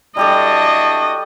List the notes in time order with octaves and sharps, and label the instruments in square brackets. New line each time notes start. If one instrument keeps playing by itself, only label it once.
[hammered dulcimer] G3 G4 A4 [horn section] D4 E4 F#4 [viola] D#5